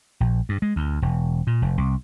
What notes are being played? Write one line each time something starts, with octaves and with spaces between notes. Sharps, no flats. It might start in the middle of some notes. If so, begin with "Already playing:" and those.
A#1
G2
G#3
D2
E1
A#2
F1
C2